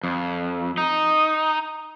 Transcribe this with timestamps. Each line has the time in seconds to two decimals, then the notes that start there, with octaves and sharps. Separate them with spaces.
0.04 F2
0.78 D#4